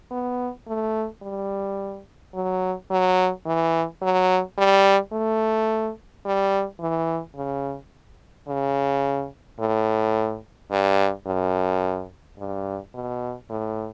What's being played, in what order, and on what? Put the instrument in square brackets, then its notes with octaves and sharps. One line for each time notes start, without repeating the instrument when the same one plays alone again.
[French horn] B3
A3
G3
F#3
F#3
E3
F#3
G3
A3
G3
E3
C#3
C#3
A2
G2
F#2
G2
B2
A2